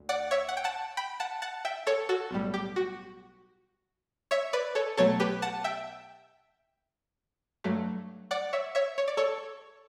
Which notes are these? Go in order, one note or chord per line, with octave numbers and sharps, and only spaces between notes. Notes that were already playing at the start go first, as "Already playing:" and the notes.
Already playing: D2
D5 F#5
C#5 E5
F#5
G5
F#5 A5
G5 B5
F#5 A5
F#5 A5
E5 G5
A4 C#5
F#4 A4
B1 A2 G3
G4
F#4
C#5 E5
B4 D5
A4 C#5
B1 B2 F#3 A3 A4 C#5
G4 B4
F#5 A5
E5 G5
G2 F#3 A3
D5 F#5
C#5 E5
C#5 E5
C#5
D5
A4 C#5